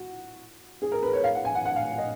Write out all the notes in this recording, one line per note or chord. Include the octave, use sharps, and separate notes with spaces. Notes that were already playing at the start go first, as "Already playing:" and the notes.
Already playing: F#4
G#4
A#4
B4
C#5
F5
F#5
G#5
F#5
F#5
F5
D#5